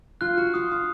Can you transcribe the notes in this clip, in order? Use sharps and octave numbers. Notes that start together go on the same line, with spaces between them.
F4 F#6
F#4
F4 D#6
F4